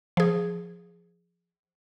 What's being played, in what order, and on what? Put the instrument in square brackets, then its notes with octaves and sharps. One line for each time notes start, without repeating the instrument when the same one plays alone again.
[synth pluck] F3 G#4